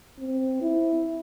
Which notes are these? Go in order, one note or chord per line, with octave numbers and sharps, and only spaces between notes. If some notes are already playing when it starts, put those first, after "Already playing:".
C4
E4